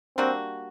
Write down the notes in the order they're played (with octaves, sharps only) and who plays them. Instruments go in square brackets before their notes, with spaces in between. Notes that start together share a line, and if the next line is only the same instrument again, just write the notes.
[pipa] G3 A#3 D4 F#4 [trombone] C4